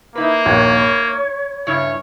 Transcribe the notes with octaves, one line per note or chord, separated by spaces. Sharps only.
A#3 D#4 E4 B4
A#1 D#2 C#5 G#6
B5
G2 C#3 E4 C#5